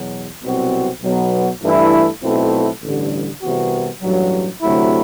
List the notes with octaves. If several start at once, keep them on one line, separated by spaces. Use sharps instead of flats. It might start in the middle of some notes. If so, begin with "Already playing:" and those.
Already playing: E2 B2 F#3
C2 B2 F#3 C4 F#4
B1 B2 F#3 B3
G2 E3 A3 E4
B1 B2 A3 C4 E4
A1 G2 D3 G3
C2 C3 E3 B3 F#4
A1 G2 F#3
D2 C3 F#3 A3 E4